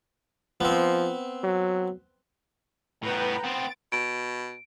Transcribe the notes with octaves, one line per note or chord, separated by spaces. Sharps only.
F3 B3 C4
F#3
A2 B3 B4 G5 A#5
B3 C4 A6 D7
B2 D7